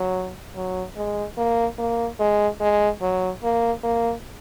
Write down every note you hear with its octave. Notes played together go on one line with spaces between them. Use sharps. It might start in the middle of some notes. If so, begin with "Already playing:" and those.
Already playing: F#3
F#3
G#3
A#3
A#3
G#3
G#3
F#3
A#3
A#3